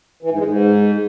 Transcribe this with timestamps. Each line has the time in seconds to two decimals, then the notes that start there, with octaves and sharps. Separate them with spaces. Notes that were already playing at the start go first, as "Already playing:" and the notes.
0.23 E3
0.31 G#2
0.39 G#3
0.47 G#2